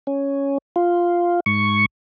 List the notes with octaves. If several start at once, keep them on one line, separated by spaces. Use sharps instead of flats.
C#4
F4
G#2 C#6